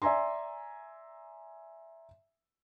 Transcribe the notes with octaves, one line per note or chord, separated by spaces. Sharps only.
D5 E5 G#5 A#5 C6